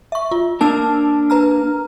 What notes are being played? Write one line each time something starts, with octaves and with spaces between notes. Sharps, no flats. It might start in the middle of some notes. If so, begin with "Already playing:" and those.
E5 C#6
F4
A#3 D4 A#4 A5 E6
B4 A#5 F6